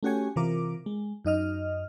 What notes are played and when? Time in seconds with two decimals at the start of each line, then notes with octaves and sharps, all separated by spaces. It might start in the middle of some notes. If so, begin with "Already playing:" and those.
0.03 A3 C#4 F#4 G4 C#5 G#5
0.36 C3 E3 F4 A#4 D6
0.86 G#3
1.25 F#2 D#4 D#5 F6